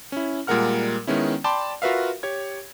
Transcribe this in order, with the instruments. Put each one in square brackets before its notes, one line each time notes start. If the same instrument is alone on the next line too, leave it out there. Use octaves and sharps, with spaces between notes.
[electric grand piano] C#4 E4
A#2 G3 G#3 A#4 F#5 F6
D#3 G#3 B3 C#4 E4
D5 G5 A5 B5 C6 D6
F4 F#4 A#4 B4 E5 F5
G4 C#5 G#6